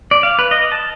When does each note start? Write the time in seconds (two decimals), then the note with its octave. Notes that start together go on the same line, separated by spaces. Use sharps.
0.11 D5
0.23 F5
0.39 B4
0.51 D#5
0.72 A5